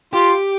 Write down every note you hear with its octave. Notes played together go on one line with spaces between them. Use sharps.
F4 G4